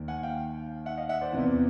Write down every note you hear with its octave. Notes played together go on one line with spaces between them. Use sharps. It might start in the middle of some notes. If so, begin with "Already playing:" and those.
Already playing: D#2 D#3
F#5 G#5
F5 G5
E5 F#5
D#5 F5
E5 F#5
C5 D5
E2 C3 E3